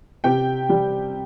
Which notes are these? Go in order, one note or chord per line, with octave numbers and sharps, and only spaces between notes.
C3 G4 G5
G3